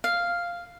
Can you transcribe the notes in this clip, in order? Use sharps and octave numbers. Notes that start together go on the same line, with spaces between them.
F5